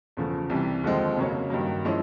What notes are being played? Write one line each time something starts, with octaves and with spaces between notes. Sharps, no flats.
E2 C#3 F3 A3
C2 C3 E3 G3
D#2 D3 F3 G#3 C4
F2 C#3 F#3 A#3 C#4
G2 D#3 F#3 A#3
F3 G#3 C#4 E4